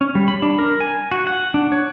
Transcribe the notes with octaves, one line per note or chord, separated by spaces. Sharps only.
C#4
G3
B5
D4
A#4
G#5
F#4
F#5
D4
C#5